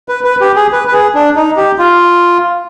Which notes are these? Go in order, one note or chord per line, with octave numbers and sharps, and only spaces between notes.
B4
B4
G4
G#4
B4
B4
G#4
D4
D#4
G4
F4